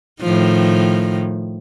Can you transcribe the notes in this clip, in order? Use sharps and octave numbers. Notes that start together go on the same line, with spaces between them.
A2 D#3 F3